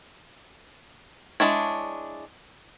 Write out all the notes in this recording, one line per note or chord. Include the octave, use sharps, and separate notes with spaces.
G#3 D4 E4 C#5